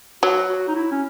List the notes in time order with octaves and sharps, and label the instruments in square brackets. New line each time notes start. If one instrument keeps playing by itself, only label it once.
[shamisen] F#3 [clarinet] F#4
[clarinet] F#4
D#4
E4
C#4